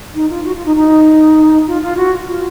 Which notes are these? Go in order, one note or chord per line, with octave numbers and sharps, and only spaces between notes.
D#4
F4
F#4
F4
D#4
D#4
F4
F4
F#4
F4